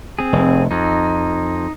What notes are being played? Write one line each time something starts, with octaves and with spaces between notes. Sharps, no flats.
C4 G#4
F1
F2 D#4